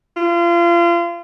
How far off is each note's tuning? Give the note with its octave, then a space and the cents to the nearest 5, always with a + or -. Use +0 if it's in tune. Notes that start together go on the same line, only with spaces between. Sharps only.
F4 -30